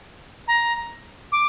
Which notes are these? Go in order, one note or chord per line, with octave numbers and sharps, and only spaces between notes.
A#5
D6